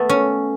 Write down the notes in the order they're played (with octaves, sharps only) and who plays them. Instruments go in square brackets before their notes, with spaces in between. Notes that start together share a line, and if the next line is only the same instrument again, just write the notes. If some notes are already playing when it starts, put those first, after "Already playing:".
Already playing: [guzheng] A3 B3
C#4